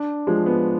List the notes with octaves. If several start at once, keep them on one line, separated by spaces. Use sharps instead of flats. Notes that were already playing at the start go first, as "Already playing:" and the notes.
Already playing: D4
F3 G#3
B3